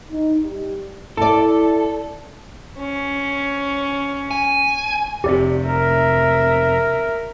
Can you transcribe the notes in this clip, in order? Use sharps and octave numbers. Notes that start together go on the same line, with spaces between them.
D#4
G3
E4 A4 D5 A5
C#4
G#5
F1 C3 G4 D5
A#4 E5